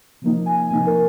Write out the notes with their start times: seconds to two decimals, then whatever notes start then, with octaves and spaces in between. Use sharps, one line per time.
0.22 C3 F3 A#3 D#4
0.46 G#5
0.70 C3 F3 A#3 D#4 G#5
0.87 A#4